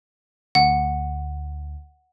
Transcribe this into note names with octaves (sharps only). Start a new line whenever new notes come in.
D2 F#5